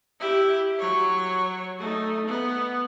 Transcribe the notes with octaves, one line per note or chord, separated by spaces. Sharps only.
E4 G4
F#3 C#5
A3 D#4
B3